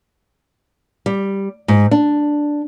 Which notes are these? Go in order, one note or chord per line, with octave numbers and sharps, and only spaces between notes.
G3
G#2
D4